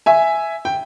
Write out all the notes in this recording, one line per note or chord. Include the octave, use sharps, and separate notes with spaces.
E5 G#5
G5